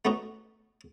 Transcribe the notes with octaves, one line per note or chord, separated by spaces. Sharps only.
A3 B3 C#4 D#4 F#4